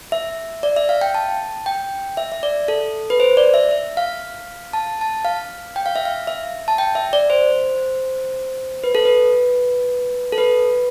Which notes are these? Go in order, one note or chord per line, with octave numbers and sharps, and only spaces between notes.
E5
D5
E5
F5
G5
A5
G5
E5
E5
D5
A4
B4
C5
D5
E5
E5
F5
A5
A5
F5
G5
F5
E5
F5
E5
A5
G5
E5
D5
C5
B4
A4
B4
A4
B4